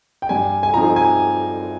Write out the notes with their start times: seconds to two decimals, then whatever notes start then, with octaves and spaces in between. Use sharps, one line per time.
0.22 G5
0.29 G2 G#5
0.63 G#5
0.74 F3 C4 D#4 A#5
0.96 G#5